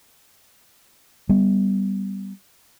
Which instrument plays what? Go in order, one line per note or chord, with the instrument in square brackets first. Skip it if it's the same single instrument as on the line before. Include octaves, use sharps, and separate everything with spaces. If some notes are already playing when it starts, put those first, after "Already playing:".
[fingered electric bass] G3 B3